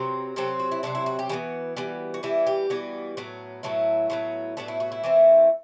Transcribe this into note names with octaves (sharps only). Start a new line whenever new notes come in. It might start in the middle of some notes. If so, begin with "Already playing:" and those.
Already playing: C3 F#3 C4 B4
C3 F#3 C4 A4
F#4
E4
C3 F#3 C4 D4
E4
F#4
G4
E3 G3 B3 F#4
E3 G3 B3
F#4
E3 G3 B3 E4
G4
E3 G3 B3 F#4
A2 F#3 B3
A2 F#3 B3 E4
A2 F#3 B3
A2 F#3 B3 D4
E4
F#4
E4
E3 A3 C4